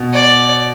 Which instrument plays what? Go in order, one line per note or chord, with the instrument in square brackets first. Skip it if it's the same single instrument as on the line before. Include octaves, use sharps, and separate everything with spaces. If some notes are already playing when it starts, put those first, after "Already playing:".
Already playing: [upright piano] B2
[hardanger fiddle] D5